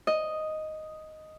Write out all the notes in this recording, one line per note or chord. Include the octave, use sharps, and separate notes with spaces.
D#5